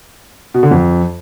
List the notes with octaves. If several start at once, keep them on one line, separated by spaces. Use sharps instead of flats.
B2
D3
F2